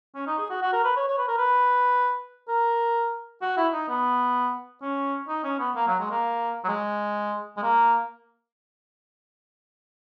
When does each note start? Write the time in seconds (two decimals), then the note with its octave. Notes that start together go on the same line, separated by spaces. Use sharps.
0.15 C#4
0.27 D#4
0.38 G#4
0.50 F#4
0.62 F#4
0.73 A#4
0.84 B4
0.96 C#5
1.08 C#5
1.17 B4
1.28 A#4
1.37 B4
2.48 A#4
3.42 F#4
3.57 E4
3.73 D#4
3.88 B3
4.82 C#4
5.28 D#4
5.44 C#4
5.59 B3
5.75 A#3
5.88 F#3
5.99 G#3
6.11 A#3
6.64 F#3
6.68 G#3
7.57 G#3
7.62 A#3